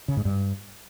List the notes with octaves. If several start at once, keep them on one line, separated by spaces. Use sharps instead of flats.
C#3
G#2
G2